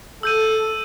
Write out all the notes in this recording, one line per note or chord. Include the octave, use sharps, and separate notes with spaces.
A4 E6 G6 D#7